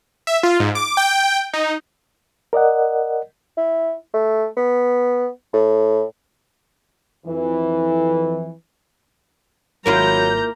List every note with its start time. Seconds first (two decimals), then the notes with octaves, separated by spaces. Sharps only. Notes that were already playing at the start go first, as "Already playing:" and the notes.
0.27 E5
0.43 F4
0.60 G#2
0.75 D6
0.97 G5
1.53 D#4
2.53 A#4 D5 D#5 F#5
3.57 E4
4.14 A3
4.57 B3
5.53 A2
7.26 F2 E3
9.86 G#1 F#3 A#3 E4 F4 A#5 G6